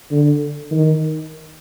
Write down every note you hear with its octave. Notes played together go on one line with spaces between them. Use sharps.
D3
D#3